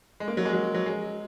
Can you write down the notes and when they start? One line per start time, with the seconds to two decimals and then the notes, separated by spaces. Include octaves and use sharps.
0.20 G#3
0.28 A#3
0.37 F#3
0.45 G#3
0.53 F#3
0.74 F#3
0.86 G#3